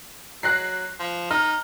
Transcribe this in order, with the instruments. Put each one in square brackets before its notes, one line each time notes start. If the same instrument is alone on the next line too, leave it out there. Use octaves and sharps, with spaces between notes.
[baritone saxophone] F#3 [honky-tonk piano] F#6 A#6 C7
[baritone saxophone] F3
[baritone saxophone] D#4 [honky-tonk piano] F6